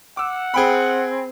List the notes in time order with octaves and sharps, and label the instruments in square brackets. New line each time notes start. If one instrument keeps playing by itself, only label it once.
[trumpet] F#5 [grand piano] D6 E6
[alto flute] C4 [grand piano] G#4 G5 B5